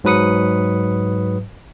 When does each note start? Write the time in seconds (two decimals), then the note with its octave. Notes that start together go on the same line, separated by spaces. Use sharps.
0.04 G#2 F#3 B4 D#6 C#7